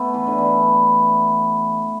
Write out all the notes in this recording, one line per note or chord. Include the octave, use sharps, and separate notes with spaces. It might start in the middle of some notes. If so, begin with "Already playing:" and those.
Already playing: A3 B3
E3
D3
E3